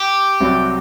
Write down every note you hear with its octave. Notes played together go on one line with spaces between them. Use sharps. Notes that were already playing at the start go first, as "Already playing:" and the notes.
Already playing: G4
C2 C3 F#3 C4 F#4